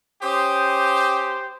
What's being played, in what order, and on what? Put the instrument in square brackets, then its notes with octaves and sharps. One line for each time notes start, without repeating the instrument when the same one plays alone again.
[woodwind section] C#4 D6 D#6 [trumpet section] G4 C5